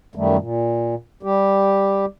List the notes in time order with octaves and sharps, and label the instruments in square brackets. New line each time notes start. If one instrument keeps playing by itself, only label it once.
[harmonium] F#2 D#3 G3 A3
A#2
G3 G4